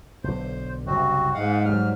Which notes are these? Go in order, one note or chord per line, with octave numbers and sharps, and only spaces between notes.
B1 D3 C5
F#1 C2 C4 F#4
G#2 G#3 F5 F#5
F#3 G3 F6